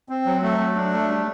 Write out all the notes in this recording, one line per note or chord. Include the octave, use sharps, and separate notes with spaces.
C4
F#3
A3
F#3
D4
A3
G3